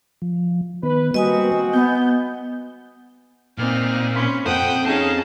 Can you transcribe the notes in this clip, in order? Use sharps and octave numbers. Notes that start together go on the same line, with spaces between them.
F3
D#3 B3 B4
G3 A#3 C4 F#4 B4 D#5 G#5 D#6
B3 G6
A#2 C4 D#4 F6
C#4 B5 C6 B6
F2 C5 F#5 G5 D#6
C#4 D#4 G#4 F5 A5